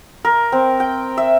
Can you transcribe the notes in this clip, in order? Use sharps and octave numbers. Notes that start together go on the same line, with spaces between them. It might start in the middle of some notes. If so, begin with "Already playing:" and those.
A#4
C4
G5
E5